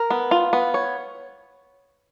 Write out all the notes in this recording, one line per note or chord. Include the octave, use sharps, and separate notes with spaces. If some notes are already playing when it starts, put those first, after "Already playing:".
Already playing: A#4
B3
F4
B3
C#5